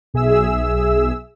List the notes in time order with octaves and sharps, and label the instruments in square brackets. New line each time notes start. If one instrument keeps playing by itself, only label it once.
[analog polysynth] B1 G#4 E5 E6